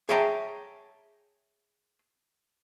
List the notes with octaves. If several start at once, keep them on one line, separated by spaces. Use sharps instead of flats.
G#4 C#5 E5 G5 A5 A#5